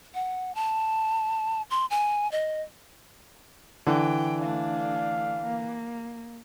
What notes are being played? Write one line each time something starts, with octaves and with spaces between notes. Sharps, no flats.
F#5
A5
C6
G#5
D#5
D3 E3 G5
A3 D4 F5
A#3